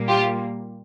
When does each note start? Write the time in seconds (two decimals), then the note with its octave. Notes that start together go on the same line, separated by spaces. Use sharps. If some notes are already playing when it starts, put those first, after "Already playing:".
Already playing: A#2 G3 A#3
0.08 F4 G4